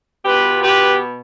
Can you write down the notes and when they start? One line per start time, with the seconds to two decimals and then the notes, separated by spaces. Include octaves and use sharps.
0.24 B2 B3 F4 G4 B4
0.62 G4 B4